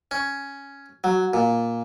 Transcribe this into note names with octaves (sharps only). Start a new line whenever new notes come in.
C#4
F#3
A#2